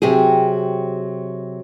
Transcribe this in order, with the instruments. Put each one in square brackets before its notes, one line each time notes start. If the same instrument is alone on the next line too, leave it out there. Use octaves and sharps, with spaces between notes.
[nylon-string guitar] C3 F#3 G4 G#4